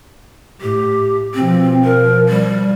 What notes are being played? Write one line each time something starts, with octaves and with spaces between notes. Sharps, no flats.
A2 G4
B2 F3 C4
A#4
G3